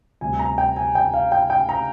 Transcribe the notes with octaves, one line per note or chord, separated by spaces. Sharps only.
D2 C3 G3 G#5
A#5
G5
G#5
G5
F5
G5
G5
A#5